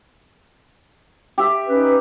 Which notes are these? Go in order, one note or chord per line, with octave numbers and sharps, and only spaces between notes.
G4 E5
C#4 D#4 B4